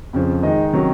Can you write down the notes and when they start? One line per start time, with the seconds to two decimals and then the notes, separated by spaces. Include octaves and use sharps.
0.13 F2 C#3 F3
0.43 D#3 G#3 D#4 D#5
0.73 C3 D#3 F#3 C#4